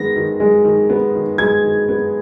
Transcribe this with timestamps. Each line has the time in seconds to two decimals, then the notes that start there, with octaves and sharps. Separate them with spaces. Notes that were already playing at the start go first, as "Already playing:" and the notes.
Already playing: D#3 G#3 B3 A#6
0.16 D#3
0.40 G#3
0.65 D#3
0.90 B3
1.15 D#3
1.38 G#3 G#6
1.64 D#3
1.89 B3